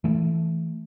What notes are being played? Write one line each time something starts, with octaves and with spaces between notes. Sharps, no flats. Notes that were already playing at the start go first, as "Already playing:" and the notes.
E3 A3